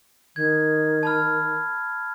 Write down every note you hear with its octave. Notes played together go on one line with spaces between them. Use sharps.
D#3 G#6
A5 B5 F6